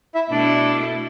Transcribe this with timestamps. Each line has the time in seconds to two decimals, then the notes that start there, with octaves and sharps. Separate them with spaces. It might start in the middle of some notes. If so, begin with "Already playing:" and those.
0.15 E4 E5
0.31 B2 A3 D4 E4 D5